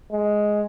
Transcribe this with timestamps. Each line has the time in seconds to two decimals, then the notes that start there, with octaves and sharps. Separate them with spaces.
0.12 G#3